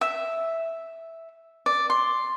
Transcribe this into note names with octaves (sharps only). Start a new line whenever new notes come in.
E5
D5
C6